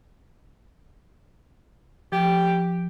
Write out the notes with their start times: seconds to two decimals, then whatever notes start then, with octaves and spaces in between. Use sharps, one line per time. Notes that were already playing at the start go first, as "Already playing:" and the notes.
2.12 F3 G4